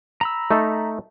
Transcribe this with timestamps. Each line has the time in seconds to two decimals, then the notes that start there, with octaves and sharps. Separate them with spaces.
0.21 A#5 B5 E6
0.51 A3 D#4 A4